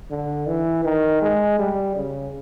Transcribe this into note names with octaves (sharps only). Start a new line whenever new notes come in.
D3
E3
D#3
G#3
G3
C#3